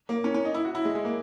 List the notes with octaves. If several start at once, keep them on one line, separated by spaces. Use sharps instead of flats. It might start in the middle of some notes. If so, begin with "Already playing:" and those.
A#3
C#4
C#4
D#4
E4
F#4
E4
G#3
G#3
A#3